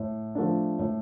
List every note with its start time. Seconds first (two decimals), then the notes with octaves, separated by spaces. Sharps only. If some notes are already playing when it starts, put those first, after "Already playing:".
Already playing: A2
0.35 F3 A3 D4
0.79 A2